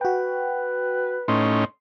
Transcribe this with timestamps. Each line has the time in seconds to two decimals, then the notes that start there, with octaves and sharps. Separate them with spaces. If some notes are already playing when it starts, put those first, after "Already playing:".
0.01 F#4 B4 G5
1.28 A2 C#4 D#4 C6